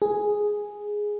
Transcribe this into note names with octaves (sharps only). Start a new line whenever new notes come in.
G#4